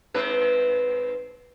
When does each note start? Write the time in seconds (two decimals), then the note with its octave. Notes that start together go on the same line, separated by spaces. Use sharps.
0.14 G#2 C4 B4